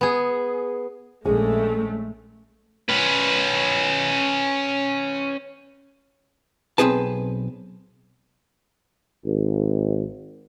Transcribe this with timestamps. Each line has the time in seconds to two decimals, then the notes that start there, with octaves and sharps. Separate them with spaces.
0.01 B3 G#4
1.25 A#1 G#3 A3 C#4 G#4
2.89 C#4 B4
6.78 B1 C3 C4 G#4 B4 A5
9.25 G#1